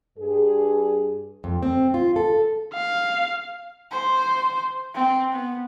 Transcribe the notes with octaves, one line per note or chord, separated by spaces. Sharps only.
G2 G#4
F2
C4
F4
A4
F5
C5
C4
B3